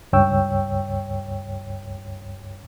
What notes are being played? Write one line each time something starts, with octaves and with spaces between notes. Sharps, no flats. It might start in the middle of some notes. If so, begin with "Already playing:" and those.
C#2 G2 C#5 G5 E6